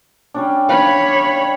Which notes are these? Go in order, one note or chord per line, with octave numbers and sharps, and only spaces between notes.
G3 C#4 D4
C#5 F5 B5